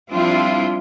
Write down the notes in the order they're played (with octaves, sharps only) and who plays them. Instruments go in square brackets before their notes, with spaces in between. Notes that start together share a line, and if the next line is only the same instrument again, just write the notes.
[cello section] F3 G3 C4 D4 E4 F4